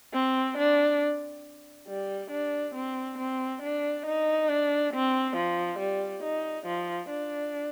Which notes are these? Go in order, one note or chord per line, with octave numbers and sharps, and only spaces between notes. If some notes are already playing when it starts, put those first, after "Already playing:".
C4
D4
G3
D4
C4
C4
D4
D#4
D4
C4
F3
G3
D#4
F3
D4